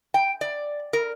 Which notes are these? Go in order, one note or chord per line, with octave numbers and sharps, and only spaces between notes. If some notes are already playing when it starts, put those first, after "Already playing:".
G5
D5
A#4